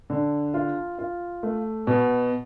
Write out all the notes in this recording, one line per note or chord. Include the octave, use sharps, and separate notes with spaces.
D3
F4
F4
A3
B2